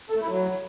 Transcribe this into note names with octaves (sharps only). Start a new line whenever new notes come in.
A4
A3
E4
F#3